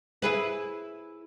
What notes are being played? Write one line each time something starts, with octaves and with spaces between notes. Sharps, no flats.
E4 G#4 B4